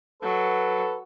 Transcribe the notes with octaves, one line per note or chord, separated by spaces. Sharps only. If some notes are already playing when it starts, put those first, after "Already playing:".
F#3 A4 B4